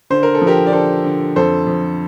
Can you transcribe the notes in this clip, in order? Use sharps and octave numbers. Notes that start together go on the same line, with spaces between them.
D3 C5
A#4
A4
F3
G4 A#4
D5
D3 A4 C5
D3
F2 A4 C5
F2